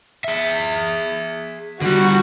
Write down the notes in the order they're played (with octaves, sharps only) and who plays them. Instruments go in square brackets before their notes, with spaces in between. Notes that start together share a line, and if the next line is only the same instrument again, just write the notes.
[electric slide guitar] G#4 E5
[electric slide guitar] D3 G3 [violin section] F#4